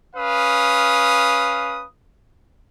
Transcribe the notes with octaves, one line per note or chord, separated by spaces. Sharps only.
C#4 B4 F5 D#6